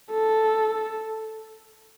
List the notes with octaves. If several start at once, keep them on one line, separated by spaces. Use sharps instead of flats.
A4